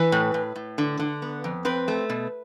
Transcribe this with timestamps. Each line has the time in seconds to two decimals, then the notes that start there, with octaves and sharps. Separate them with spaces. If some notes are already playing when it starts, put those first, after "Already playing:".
Already playing: E3 B4
0.12 A2
0.34 A2
0.56 A2
0.78 D3
0.99 D3
1.22 B3
1.44 F2
1.65 C4 B4
1.88 A3
2.10 B2